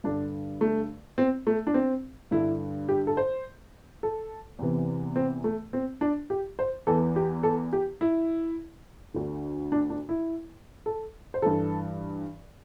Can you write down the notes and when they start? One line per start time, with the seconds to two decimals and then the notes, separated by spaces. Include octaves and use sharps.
0.04 G2 D3 D4
0.61 A3
1.18 C4
1.47 A3
1.67 D4
1.74 C4
2.31 G2 D3 E4
2.89 G4
3.07 A4
3.17 C5
4.03 A4
4.59 E2 C3 E3
5.16 C4
5.44 A3
5.73 C4
6.01 D4
6.30 G4
6.59 C5
6.87 E2 E3 A4
7.16 G4
7.43 A4
7.73 G4
8.01 E4
9.14 D2 D3
9.72 D4
9.90 D4
10.09 E4
10.86 A4
11.34 C5
11.42 G2 E3 A4